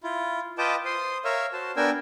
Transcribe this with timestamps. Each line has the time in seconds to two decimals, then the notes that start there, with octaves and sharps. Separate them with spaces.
0.03 E4 F4
0.58 F4 B4 D#5 G5 A5 D6
0.85 C5 C6 D#6
1.25 A#4 C#5 E5 F5 E6
1.53 F#4 C5 A5
1.77 B3 D4 A#4 G5 G#5 E6